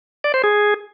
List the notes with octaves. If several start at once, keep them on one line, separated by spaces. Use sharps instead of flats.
D5
C5
G#4